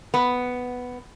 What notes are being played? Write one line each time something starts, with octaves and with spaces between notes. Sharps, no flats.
B3